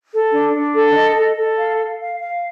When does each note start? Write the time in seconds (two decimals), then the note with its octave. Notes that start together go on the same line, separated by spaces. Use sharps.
0.12 A4
0.33 D4
0.53 D4
0.74 A4
0.94 D#5
1.15 A4
1.36 A4
1.58 F5
1.78 F5
1.99 F5
2.19 F5